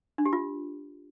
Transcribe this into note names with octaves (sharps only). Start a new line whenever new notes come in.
D4
G4
F4